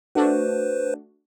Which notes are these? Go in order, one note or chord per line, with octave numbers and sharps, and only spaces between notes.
A3 D4 F#4 B4 C5